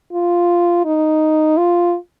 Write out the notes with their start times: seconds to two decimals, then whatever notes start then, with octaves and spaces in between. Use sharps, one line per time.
0.13 F4
0.85 D#4
1.57 F4